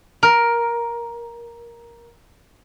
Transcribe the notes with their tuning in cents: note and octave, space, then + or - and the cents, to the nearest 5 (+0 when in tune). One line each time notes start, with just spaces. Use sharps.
A#4 +10